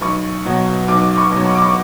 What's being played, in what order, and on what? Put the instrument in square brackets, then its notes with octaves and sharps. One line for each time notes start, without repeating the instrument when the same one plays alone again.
[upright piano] B1 C#6
B2 F#3
B1 D6
C#6
B2 F#3
C#6
D6
C#6